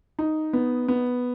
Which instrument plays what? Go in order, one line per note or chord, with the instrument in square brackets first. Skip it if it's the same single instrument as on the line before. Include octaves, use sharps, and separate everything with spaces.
[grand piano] D#4
B3
B3